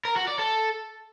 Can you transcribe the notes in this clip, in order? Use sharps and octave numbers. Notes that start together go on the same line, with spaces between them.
A#4
F#4
D5
A4